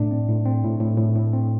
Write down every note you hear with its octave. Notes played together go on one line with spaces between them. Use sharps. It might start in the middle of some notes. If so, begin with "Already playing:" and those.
Already playing: A2 A3 D4
C4
A2
C4
A2
A2
A2
A2
C4